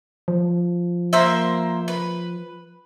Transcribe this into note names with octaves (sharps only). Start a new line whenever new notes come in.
F3
A#3 C5 E5
B4